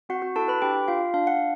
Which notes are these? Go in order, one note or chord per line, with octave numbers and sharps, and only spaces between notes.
C4 F#4 F#5
F#4 F#5
E4 A4 A5
B4 B5
D4 G4 G5
F4 F5
D4 F5
F#5